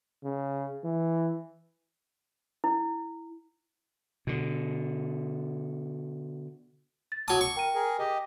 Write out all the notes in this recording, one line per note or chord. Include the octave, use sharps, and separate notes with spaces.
C#3
E3
E4
B2 D3
A6
F#3 A5 D6 D#6
C#6
A#4 G5 D#7
G#4 A#4
G4 D#5